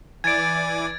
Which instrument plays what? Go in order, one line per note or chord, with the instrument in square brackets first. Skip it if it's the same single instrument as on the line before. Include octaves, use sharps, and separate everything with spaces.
[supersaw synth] E3 D5 [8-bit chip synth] G#5 D6 [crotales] G#6 A6 D7